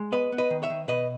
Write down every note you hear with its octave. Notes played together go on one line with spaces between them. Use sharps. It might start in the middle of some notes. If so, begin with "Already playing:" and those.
Already playing: G#3
B3 B4 D#5
B3
B4 D#5
D#3
C#5 E5
D#3
B2 B4 D#5